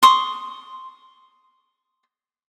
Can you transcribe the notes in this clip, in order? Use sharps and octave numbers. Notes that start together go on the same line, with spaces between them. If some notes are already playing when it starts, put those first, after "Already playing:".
C6 C#6 D#6